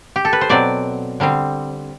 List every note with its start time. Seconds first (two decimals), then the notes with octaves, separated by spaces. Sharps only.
0.16 G4
0.25 A4
0.33 B4
0.41 C5
0.49 B2 F#3 C4 D5
1.20 D3 G3 C4